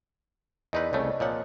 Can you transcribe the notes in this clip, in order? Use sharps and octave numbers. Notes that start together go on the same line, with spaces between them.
E2 D#4 A#4 B4 D5 D#5 C6 E6
C2 C#3 A3 C#5
A#2 F3 C#5 D#5 F#5